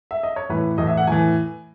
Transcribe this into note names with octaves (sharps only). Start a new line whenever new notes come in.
E5
D#5
C#5
A2 E3 B4
A2 E3 D#5
E5
F#5
A2 E3 G#5